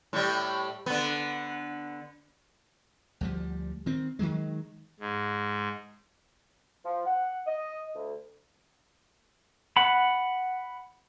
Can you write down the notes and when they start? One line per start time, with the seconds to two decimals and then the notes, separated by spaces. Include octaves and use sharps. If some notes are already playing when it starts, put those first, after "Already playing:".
0.13 A2 G3
0.86 D3 B3
3.21 D2 F3 G3
3.86 D#3 C4
4.19 D#3 E3 F#3 G#3
5.00 G#2
6.84 F3
7.05 F#5
7.46 D#5
7.94 D2
9.77 F#5 B5